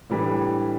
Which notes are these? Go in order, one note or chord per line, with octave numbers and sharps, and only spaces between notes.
A2 E3 G3 D4